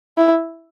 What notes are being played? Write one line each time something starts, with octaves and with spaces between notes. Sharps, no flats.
E4